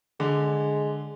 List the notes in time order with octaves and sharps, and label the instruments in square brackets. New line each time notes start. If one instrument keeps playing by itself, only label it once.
[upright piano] D3 [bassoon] G#3